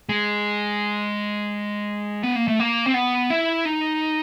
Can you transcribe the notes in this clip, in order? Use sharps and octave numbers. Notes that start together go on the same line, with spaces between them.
G#3
B3
A#3
A3
A#3
C4
B3
E4
D#4